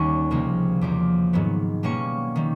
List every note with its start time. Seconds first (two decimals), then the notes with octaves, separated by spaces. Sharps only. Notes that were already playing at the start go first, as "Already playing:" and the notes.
Already playing: D#2 D#3 G3 A#3 C#4 C#6
0.30 C#2 C3 F3 A#3
0.81 E2 C#3 F3 A#3 D6
1.33 G#2 D#3 F#3 B3
1.83 B2 G3 A#3 C#4 C#6
2.36 D#3 G3